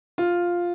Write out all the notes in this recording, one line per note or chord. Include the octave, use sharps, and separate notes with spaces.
F4